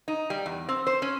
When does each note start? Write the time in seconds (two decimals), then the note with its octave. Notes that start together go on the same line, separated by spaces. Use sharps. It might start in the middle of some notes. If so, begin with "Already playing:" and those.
0.08 D#4
0.30 G3
0.46 E2
0.69 C4
0.87 C5
1.02 C#4